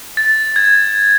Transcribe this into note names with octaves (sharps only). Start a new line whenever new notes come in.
A6
G#6